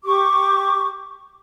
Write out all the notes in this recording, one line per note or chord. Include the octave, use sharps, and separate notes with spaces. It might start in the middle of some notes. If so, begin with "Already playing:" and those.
G4 C#6 D6